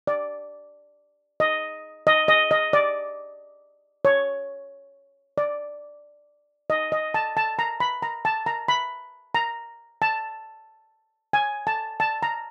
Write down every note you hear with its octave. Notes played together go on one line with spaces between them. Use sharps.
D5
D#5
D#5
D#5
D#5
D5
C#5
D5
D#5
D#5
A5
A5
A#5
B5
A#5
A5
A#5
B5
A#5
A5
G#5
A5
A5
A#5